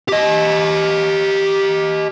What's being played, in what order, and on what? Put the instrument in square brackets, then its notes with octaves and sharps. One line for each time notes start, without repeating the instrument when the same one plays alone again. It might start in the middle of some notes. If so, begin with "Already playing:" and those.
[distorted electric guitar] G4 D#5